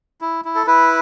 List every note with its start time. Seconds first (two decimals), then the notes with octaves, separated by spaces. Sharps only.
0.21 E4
0.45 E4
0.55 A4
0.67 E4 B4